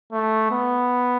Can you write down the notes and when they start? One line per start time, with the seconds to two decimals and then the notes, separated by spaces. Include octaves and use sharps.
0.12 A3
0.51 B3